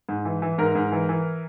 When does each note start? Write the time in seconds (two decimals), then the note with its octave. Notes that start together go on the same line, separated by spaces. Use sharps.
0.09 G#2
0.25 E3
0.42 E3
0.58 G#2 A#4
0.75 G#2
0.92 E3
1.09 E3